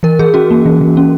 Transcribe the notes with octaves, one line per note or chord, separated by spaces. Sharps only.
E3 A#4
E3 G#4
C#4 F#4
A#3
E3
E3
C#4